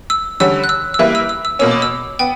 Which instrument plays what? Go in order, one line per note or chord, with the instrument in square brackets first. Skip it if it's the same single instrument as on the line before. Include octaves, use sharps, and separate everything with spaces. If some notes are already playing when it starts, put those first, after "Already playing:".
[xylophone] E6
[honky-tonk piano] D3 G3 C#4 [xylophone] E6
[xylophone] F#6
E6
E6
[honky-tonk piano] G3 A#3 E4 B4 E5 [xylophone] F#6
[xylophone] E6
E6
E6
[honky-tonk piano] B2 A#3 C#4 [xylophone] E6
[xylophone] D6
E6
[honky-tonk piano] B3 [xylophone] G5